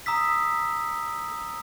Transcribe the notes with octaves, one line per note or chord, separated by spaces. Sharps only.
A#5 D#6 E6 B6